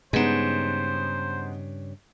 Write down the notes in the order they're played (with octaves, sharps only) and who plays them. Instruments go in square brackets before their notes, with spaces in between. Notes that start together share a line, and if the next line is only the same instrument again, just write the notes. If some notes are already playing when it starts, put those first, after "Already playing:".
[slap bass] G2 C#3 [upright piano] G#3 B3 D#4 [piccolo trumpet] C5